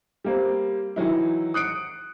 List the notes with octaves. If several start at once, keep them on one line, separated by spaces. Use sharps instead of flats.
G3 A#3 C4
D#3 E3 F#3 E4
D#6 F#6 C#7 D7